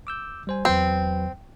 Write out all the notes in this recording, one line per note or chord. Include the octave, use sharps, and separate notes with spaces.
D6 E6 G6
G3 C5 G#5
E2 F#3 C4 B4